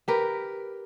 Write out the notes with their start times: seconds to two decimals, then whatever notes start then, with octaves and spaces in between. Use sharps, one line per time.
0.08 G4 A#4 B4